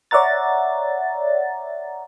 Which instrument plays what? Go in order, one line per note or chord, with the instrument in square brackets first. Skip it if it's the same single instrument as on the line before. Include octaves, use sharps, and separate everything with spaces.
[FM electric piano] C#5 D5 E5 F#5 A#5 A6